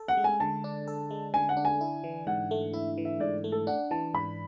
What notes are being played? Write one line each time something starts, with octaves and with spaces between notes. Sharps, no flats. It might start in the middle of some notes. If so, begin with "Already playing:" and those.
Already playing: A4
F#5
G#3
G#5
D3 A5
D4
A4
G#3
D3 G#5
F#5
D4
G#5
E4
E3
G#2 F#5
A3
E4 E5
E3
E5
G#2 D5
A3
A4
D4 F#5
E3 A5
G#2 B5